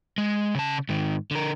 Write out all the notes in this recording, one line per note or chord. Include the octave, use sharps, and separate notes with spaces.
G#3
C#3 A5
G#2 D#3
D3 A#4